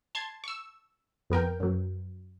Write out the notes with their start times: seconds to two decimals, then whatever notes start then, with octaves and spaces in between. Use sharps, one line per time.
0.15 A5 C6 G#6
0.44 C#6 E6
1.30 F2 B3 A#4 G5
1.60 F#2 F#3